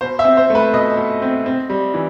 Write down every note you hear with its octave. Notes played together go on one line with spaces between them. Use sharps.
B2 C5
E5
C4
C5
A3
B4
B2 D#5
B2
C4
C4
G3
E3